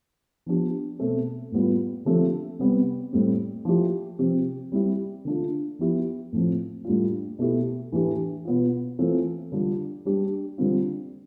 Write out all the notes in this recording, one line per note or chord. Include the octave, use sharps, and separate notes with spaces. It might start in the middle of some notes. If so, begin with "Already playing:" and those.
F3 B3 D4 G4
B2 A3 C4
A2 G3 B3 F4
D3 F3 A3 C4 G4
C3 G3 B3
A2 G3 C4
F3 A3 E4 G4
C3 F3 C4 G4
G3 C4 E4 G4
D3 A3 D4 F4
F3 B3 E4 G4
A2 F3 C4
A2 G3 D4 F4
B2 A3 E4 G4
A2 E3 A3 D4 G4
B2 B3 F4
E3 A3 C4 F4
D3 G3 D4 F4
G3 D4 G4
D3 G3 C4 F4